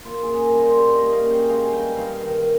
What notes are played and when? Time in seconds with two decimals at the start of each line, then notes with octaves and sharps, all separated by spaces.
0.05 A#3 F4
0.23 G#4
0.29 C#3
0.41 A#4
0.53 G3
0.59 C5
0.77 G3 C#5
0.95 D#5
1.01 A#3
1.13 F5
1.25 C#3
1.31 G5
1.49 G#3 F5
1.73 G2 G5
1.97 G2 F5
2.21 D#3